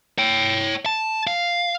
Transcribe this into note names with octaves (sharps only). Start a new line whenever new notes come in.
C#5 G5
A5
F5